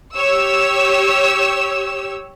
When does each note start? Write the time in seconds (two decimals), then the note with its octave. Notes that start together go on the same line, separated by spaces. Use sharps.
0.15 G4 C#5 E6